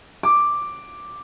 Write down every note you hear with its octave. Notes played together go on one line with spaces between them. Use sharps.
D6